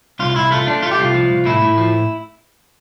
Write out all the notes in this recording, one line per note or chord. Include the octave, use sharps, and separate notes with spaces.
C2 F4
C2 E4
A3 F4
A3 D4
A3 F4
G4
C2 F4
F3
C2
A2 E4
A2
F3